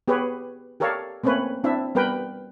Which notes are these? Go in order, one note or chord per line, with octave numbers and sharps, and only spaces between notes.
B3 G4 G#4 B4 C#5
G4 A4 A#4 C#5 D5 F5
A3 A#3 C4 C#4 B4 C#5
C4 D4 E4 E5
G3 B3 A#4 B4 G5